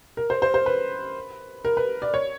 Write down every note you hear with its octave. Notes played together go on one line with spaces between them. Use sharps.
A#4
C5
C5
C5
B4
A#4
B4
D5
C#5